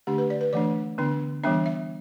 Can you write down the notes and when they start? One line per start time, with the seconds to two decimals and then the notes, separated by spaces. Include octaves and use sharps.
0.07 D3 A3 D4 G4
0.18 B4
0.30 D5
0.41 B4
0.53 E3 A3 D4 D5
0.98 D3 B3 D4
1.44 E3 G3 B3 D4 E5
1.66 E5